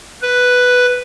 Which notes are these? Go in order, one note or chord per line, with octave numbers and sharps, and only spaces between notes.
B4